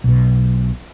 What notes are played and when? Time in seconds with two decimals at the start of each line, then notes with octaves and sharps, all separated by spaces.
0.04 B1 B2